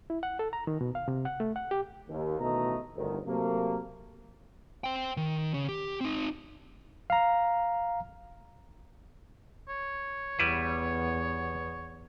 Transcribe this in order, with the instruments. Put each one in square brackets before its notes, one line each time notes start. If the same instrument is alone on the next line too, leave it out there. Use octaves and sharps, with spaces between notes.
[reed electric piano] E4
F#5
A4
A#5
D#3
B2
F5
C3
F#5
A3
F#5
G4
[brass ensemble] D#2
A1 B2 D#3 A3 D#5 A#5
G1 D2 D#3
C3 F#3 A3 A#3
[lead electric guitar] C5 G5
D#3
C#3
G4
C4 D#4
[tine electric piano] F5 A#5
[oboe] C#5
[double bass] E2 B3 [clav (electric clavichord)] G3 E4 B4